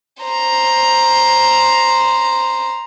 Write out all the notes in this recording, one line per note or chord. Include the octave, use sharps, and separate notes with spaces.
C5 A#5